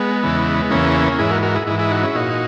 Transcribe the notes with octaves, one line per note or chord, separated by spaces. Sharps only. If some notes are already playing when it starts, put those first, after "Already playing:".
Already playing: G#3 B3
E2 C#3 E3
E2 C#3 E3 A#3 C#4
G#2 E3 E4 G#4
F#4 A#4
F#4 A#4
E4 G#4
G#2 E3 E4 G#4
E4 G#4
D#4 F#4
C#4 E4
A#2 D#4 F#4